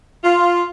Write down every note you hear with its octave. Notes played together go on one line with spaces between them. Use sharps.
F4